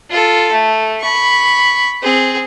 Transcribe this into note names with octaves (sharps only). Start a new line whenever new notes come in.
F4 A4
A3
B5 C#6
C4 G#4